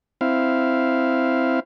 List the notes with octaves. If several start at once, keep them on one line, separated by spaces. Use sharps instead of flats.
C4 E4 F5